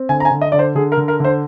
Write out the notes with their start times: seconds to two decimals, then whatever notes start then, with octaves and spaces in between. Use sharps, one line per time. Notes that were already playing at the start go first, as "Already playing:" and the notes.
Already playing: C4
0.09 D3 G#5
0.20 A#5
0.25 G#5
0.31 D3
0.41 D#5
0.52 D3 D5
0.59 C5
0.75 D3 G#4
0.92 A#4
0.97 D3
1.08 A#4
1.20 D3 C5